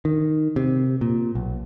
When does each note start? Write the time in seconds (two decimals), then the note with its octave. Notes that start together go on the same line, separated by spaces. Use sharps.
0.05 D#3
0.56 C3
1.01 A#2
1.35 B1